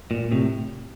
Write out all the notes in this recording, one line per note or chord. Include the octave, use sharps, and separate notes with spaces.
A#2
A2 C3